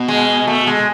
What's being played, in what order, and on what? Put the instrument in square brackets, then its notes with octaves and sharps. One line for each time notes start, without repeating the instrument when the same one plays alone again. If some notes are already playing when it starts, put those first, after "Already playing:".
Already playing: [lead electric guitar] B2
[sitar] G#3
A3
G#3